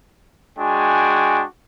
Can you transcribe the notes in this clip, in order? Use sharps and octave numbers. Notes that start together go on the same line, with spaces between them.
G#3 D4 F#4 G5 G#5